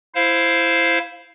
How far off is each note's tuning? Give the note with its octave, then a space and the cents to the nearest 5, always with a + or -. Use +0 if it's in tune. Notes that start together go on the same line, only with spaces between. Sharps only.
E4 +15 C5 +0 F5 +0